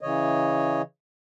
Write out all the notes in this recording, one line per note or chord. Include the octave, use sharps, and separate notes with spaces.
C#3 E3 C#5 D#5